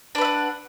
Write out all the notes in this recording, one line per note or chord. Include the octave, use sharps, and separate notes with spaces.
D4 B4 E5 F#5